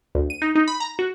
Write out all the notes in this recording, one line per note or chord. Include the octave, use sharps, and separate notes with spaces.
D2
D#7
D#4
D#4
B5
A#5
F#4